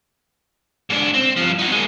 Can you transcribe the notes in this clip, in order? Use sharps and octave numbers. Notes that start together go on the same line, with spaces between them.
G#2 D4
C4
G2 F3
D#4 F#4
G#3 A#3